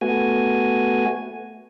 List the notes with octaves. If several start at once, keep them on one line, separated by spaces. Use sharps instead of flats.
A3 B3 F#4 G#5